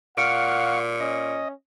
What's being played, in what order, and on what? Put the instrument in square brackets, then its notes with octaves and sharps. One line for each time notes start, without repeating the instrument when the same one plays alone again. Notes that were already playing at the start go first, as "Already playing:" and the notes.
[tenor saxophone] A#2 [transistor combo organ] F5 C#6 [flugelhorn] F#5 [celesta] F6 C#7 D7
[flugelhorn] C#4 [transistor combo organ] D#5